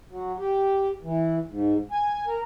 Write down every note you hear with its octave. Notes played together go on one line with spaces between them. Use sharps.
F#3
G4
E3
G#2
G#5
A#4